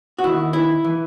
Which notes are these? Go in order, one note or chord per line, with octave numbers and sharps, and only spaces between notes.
F#4
D#2 D#3 E4
E4
E3